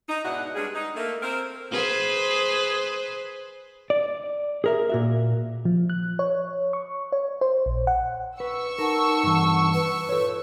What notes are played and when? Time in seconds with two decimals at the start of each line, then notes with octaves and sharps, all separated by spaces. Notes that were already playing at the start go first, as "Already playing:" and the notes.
0.09 D#4
0.24 G#2 B2 D4 E4 F#5
0.55 G3 G#3 B3 C#4 D4 G#4
0.75 D#4
0.96 A3 A#3
1.23 C4 A#4 C5
1.72 G#4 B4 C5
3.90 D5
4.64 G#4 A#4 E5
4.90 A#2 F#4 E5
5.65 F3
5.90 F#6
6.19 C#5
6.73 C#6
7.12 C#5
7.41 C5
7.66 A#1
7.87 F#5
8.40 B4 C#6 E6
8.79 D#4 A#4 F#5 A5
9.23 G2 E3
9.74 B4
10.09 F4 A4 C#5